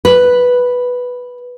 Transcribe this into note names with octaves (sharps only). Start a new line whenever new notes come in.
B4